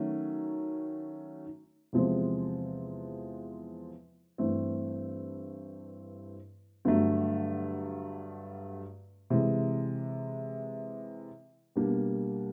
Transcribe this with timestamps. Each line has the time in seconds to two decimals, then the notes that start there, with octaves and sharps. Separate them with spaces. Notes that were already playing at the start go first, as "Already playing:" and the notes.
Already playing: D#3 F#3 A3 C#4
1.93 E2 C3 F3 G#3 C4
4.38 G2 E3 A3 C4
6.85 G2 D3 F#3 A3
9.30 C3 E3 G#3
11.76 B2 G3 A#3 D4